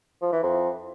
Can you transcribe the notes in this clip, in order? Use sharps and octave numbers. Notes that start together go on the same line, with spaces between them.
F3
E3
F2